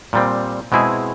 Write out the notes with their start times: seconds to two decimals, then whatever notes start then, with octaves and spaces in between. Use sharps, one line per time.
0.13 A#2 G3 C4
0.72 B2 G#3 C4 E4 G#4